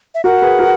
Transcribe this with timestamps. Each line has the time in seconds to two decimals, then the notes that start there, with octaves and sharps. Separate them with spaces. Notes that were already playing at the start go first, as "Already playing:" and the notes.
0.15 E5
0.24 F#4 A#4 F#5
0.42 G#4 B4
0.59 F#4 A#4